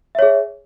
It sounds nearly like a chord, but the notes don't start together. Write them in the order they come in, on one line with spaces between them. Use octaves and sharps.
E5 C#5 G#4